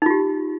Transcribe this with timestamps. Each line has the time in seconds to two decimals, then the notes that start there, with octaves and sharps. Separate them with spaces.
0.02 D#4
0.06 F4
0.10 G4